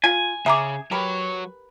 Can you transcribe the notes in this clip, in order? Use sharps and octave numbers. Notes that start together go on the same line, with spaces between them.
F4 G#5
C#3 G#4 E5 A#5 D6
F#3 G4 A#4 B4 C#5